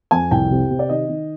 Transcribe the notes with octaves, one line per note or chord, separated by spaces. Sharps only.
F2 G#5
C2 G5
C3
C3
D5
D#3 D#5
D#3